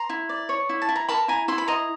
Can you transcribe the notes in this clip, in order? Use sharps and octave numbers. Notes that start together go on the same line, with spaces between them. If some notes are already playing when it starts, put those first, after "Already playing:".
Already playing: A#5 C6
E4
D5
C#5
E4
A5
E4
A#5
A#4 A5 B5
E4 G#5 A#5
E4 C6
B5
D#5 A#5 C6